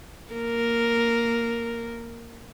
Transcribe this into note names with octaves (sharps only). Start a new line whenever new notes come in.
A#3 A#4